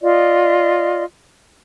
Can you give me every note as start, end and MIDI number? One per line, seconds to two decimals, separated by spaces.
0.02 1.03 65
0.02 1.03 74
0.02 1.03 75